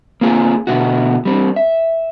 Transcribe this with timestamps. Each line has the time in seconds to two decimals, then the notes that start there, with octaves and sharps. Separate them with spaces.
0.21 A#3 C4 F4 G#4
0.67 B2 D3 B3 E4 F#4
1.25 G3 C4 D4
1.56 E5